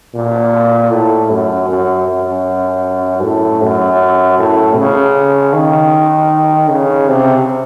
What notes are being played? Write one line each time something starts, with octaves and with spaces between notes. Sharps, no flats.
A#2
A2
F#2
F#2
F#2
A2
F#2
A2
C#3
D#3
C#3
C3